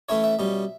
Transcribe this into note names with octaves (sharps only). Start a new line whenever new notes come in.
E3 A3 C#4 E4 C#5
E5
B2 G3 C#4